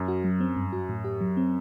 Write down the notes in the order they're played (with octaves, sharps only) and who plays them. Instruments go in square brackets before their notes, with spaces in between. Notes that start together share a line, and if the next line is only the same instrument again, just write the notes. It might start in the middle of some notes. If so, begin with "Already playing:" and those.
Already playing: [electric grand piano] F#2
[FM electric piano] F#4
F#3
C4
G2
F#4
A2
G4
F#3
C4